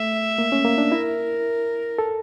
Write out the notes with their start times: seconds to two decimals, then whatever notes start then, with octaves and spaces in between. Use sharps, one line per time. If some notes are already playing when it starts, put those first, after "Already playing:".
Already playing: A3 E5
0.38 A#3
0.52 C#4
0.65 A#3
0.78 D4
0.91 E4 A#4
1.99 A4